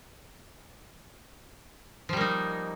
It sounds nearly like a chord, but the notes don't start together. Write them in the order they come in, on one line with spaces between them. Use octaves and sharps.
F3 G3 A#3 D#4